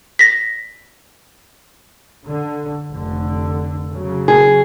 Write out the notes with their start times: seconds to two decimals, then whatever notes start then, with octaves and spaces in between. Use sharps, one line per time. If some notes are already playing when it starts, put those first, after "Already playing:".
0.19 A#6 B6
2.25 D3
2.91 F1 D3
3.91 C#3 F#3
4.28 G#4